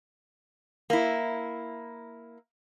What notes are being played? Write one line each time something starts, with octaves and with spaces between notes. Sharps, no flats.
A#3 E4